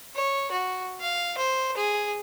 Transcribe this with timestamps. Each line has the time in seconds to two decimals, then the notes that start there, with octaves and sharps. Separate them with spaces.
0.16 C#5
0.52 F#4
1.01 F5
1.38 C5
1.77 G#4